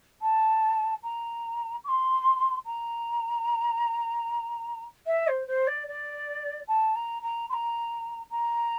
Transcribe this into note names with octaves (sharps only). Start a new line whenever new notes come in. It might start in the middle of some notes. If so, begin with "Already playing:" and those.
A5
A#5
D6
C6
A#5
E5
C5
C5
D5
D5
A5
A#5
A#5
C6
A#5
A#5